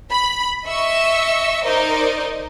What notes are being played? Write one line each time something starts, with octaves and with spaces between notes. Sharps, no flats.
B5
D#5 E5 C#6 E6
D#4 A#4 C5 D5 D#5